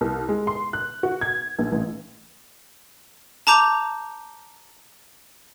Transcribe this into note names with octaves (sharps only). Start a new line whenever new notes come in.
C2
G#3
C6
F#6
F#4
G#6
A#1
A1
A5 A#5 D6 G6 F7